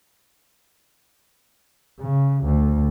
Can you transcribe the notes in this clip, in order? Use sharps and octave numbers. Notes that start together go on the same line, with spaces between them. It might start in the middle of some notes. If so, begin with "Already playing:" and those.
C#3
D2